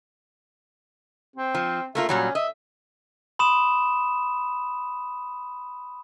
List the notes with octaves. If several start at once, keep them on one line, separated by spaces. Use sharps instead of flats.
C4
F3
A3 A#3 F4 E5
A#2 F#3 G3 C#4
D#5 E5
B5 C6 D#6 E7